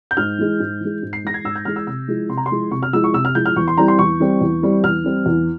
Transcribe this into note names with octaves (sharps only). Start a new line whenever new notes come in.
G6
G#2 F6
E3 G#3
G#2
E3 G#3
G#2
C7
E3 G#3 A#6
G#6
G#2 E6
G6
E3 G#3 F6
E6
C3 E6
F3 G#3 E4
C3 C6
A#5
C6
F3 G#3 E4
C3 C#6
F6
F3 G#3 E4 E6
C#6
C3 E6
F6
F3 G#3 E4 G6
F6
E2 C#6
C6
E3 G3 C4 E4 A#5
C6
E2 C#6
E3 G3 C4 E4
E2
E3 G3 C4 E4
E2 F6
E3 G3 C4 E4
E2